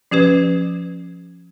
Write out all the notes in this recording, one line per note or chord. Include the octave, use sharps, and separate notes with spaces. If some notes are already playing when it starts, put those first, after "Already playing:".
F3 C#4 G4 B4